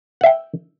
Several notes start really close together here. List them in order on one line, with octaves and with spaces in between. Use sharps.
F#5 E5 G5